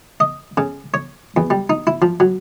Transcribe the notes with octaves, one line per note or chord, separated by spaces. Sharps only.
D#5
C#3
C#5
E2
G3
D#4
E4
F3
F#3